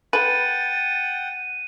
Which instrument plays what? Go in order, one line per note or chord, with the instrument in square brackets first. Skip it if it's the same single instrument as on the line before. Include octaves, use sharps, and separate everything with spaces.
[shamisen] A4 B4 [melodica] F#5 G5 [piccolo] A6 [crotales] D#7